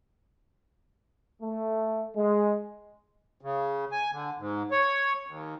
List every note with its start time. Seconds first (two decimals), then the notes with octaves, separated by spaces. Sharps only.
1.42 A3
2.16 G#3
3.41 C#3
3.92 G#5
4.12 D3
4.38 G#2
4.71 C#5
5.27 D#2